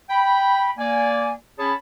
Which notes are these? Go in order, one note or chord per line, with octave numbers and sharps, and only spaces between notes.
G5 B5
A#3 D5 G#5
C#4 G#4 C#5 A5 B5